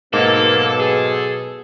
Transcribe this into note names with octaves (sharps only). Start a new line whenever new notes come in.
G#2 B2 F#3 A#3 B3 A4
G#4